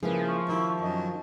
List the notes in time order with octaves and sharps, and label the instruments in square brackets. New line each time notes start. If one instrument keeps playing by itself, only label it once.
[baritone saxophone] C#3 [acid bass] F3 [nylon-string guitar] A#3 E4 G#4 [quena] B4
[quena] C#6
[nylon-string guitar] D#3 G4 [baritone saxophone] E4
[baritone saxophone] F#2 [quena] D#5